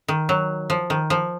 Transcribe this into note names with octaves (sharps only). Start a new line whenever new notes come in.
D#3
F#3
F3
D#3
F3